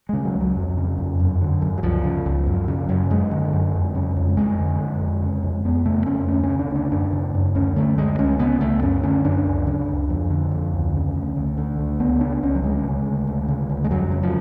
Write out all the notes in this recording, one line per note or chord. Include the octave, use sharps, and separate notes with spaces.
C#3 G#3
F#3
C#2
F#3
F2
C#3
F2
F#2
D3
F#2
F#3
C#2 F3
C#3
C#2
F#2
C#3
F#2
F#2 G#3
D3
F#2
F2
C#3
F2
F2 G#3
D3
F2
F2
C#3
F2
F2 B3
C#3 A3
F2 C#4
D2 C#4
C#4
C#3
D4
D2
D4
F#2 D4
C#3
F#2
D2 C#4
D3 A3
D2 G#3
C#2 C#4
C#3 B3
C#2 A3
F#2 C#4
D3 C#4
F#2 D4
C#2
C#3
C#2
F2
D3
F2
D2
C#3
D2
D2
D3
D2
C#2 B3
C#3 D4
C#2 C#4
F#3
D2 G#3
C#3
D2
D2
C#3
D2
G#3
F2 F#3
C#3
F3